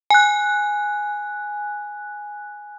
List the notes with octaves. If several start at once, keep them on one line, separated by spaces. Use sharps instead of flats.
G#5 F#6